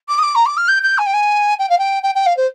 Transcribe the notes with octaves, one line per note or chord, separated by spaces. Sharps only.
D6
D#6
D6
A#5
D6
F6
G6
G6
G#5
G5
G#5
G5
F5
G5
G5
G5
F5
C5